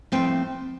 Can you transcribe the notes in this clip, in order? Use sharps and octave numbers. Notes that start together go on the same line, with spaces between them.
A2 F3 A3 C4 G5